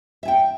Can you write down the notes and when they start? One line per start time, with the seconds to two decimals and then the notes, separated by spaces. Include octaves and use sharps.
0.23 E5
0.25 G#5
0.28 G5